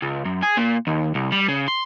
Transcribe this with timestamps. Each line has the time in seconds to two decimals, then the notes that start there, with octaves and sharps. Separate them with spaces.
0.02 C#2
0.25 F#2
0.43 G#4
0.57 A#2
0.87 D#2
1.15 C2
1.32 G3
1.49 C#3
1.68 C6